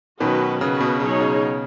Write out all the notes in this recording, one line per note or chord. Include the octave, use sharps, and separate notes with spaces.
B2 D#3 F#3 C#4 F#4 B4
C#3 B3 F#4 B4
B2
B2 F#3 D#4 G#4 C#5
C#3